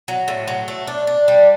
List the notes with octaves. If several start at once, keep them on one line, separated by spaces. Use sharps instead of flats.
F#3
A2
F#3
A3
D4
D4
G3